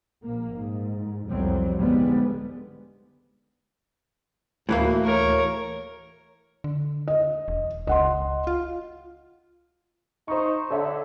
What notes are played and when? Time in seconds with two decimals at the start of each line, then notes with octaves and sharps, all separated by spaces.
0.24 A#1 A#3
0.56 G#2
1.29 C2 F2 F#3 G3 C4
1.80 G#2 D3 G3 G#3 B3
4.69 D2 A2 E3 A#3
5.04 A#4 C#5
6.64 D3
7.08 D#5
7.48 E1
7.87 C#2 D#5 F#5 C6
8.47 F4
10.28 D#4 C5 C#6
10.70 D3 A4 C#5 E5